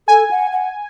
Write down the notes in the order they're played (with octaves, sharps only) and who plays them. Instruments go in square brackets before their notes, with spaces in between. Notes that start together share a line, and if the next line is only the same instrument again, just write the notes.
[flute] A4 [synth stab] G#5
[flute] F#5
F#5